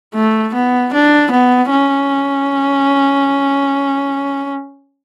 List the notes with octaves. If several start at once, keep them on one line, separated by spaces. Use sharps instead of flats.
A3
B3
D4
B3
C#4